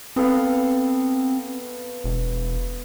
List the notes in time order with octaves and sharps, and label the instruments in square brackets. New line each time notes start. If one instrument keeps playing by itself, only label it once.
[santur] B3 A4 F5 [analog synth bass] C4
[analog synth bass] E1